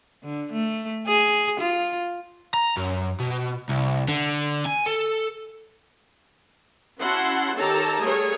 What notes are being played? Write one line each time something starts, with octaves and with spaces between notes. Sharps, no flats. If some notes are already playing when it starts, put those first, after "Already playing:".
D3
A3
G#4
F4
A#5
F#2
B2
C2
D3
G#5
A4
C#4 E4 F#4 F#5 A5 C6
D#3 G4 A4 C#5 A5 A#5
G3 A3 G#4 A#4 C#5